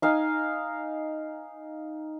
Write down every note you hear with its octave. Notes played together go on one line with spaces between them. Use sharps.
D#4 F5 G#5